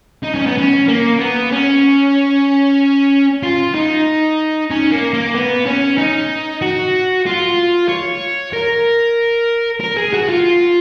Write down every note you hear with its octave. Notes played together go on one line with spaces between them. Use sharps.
D#4
C#4
B3
C#4
A#3
B3
C#4
F4
D#4
C#4
A#3
A#3
B3
C#4
D#4
F#4
F4
C#5
A#4
A#4
G#4
F#4
F4